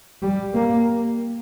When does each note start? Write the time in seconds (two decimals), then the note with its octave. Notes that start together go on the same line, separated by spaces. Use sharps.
0.22 G3
0.54 A#3